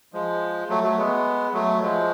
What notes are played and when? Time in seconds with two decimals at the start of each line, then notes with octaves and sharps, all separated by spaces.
0.13 F3 G#3
0.69 F#3 A3
0.84 F#3 A3
0.97 G#3 B3
1.54 F#3 A3
1.82 F3 G#3